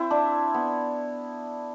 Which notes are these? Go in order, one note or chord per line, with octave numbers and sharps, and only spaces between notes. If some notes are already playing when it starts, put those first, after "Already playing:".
Already playing: C4 E4 C5
D4
B3